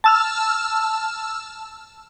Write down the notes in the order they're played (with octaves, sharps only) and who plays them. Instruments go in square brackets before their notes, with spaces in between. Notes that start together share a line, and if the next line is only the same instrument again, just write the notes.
[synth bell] A5 E6 F6